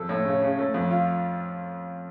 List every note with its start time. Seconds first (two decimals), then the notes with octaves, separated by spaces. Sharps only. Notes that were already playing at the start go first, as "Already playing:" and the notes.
Already playing: F2 A4
0.09 A2
0.25 C#3
0.42 C#3
0.59 A3
0.74 F2
0.90 F4